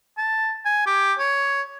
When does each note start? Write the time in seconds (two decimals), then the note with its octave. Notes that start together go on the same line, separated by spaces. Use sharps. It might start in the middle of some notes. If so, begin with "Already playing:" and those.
0.18 A5
0.65 G#5
0.86 G4
1.19 C#5